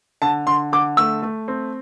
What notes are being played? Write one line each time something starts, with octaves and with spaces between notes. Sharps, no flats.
D3 A5
D3 C6
D3 D6
A3 E6
A3
C4